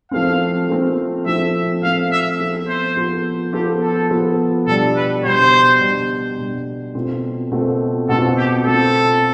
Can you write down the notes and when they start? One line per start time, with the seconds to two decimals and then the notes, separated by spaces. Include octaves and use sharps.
0.11 F3 A3 C4 F5
0.68 F3 A3 C4
1.26 F3 A3 C4 E5
1.83 F3 A3 C4 F5
2.12 E5
2.40 F3 B3 F4 A4
2.68 C5
2.96 F3 B3 F4 A4
3.53 F3 B3 F4 G4 A4
3.81 A4
4.10 F3 B3 F4 A4
4.67 B2 G3 D4 A4
4.96 B4
5.24 B2 G3 D4 C5
5.81 B2 G3 D4
6.38 B2 G3 D4
6.95 B2 A3 C4 F4
7.51 B2 A3 C4 F4
8.09 B2 A3 C4 F4 A4
8.37 G4
8.65 B2 A3 C4 F4 A4